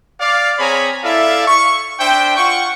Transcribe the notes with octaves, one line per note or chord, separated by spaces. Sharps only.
D5 F5
C4 G#4 C#5 G#5 A#5 B5
E4 A4 D5 E5 F5
C#6
D4 C5 E5 G5
F4 F#5 G5 C#6